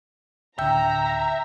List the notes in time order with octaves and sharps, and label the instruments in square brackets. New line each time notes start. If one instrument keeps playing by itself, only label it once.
[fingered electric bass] D1 D3 [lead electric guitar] E5 [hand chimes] G5 E6 G6 [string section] A#5